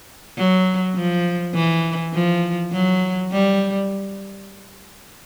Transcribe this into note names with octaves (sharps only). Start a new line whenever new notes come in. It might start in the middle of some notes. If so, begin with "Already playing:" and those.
F#3
F3
E3
F3
F#3
G3